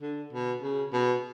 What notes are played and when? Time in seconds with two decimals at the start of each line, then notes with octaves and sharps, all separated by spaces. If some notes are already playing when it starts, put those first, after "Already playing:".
0.01 D3
0.33 B2
0.63 C#3
0.93 B2